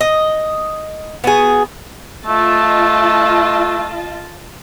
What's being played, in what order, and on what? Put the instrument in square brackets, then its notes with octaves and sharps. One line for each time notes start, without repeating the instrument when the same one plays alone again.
[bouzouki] D#5
B3 F#4 G#4
[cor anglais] A3 [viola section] F4 D#5 A5